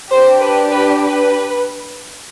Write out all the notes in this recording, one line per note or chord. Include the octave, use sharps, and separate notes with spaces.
D4 G4 C5
B4
B4
B4